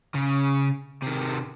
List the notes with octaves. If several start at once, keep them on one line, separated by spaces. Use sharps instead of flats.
C#3
C3 D#3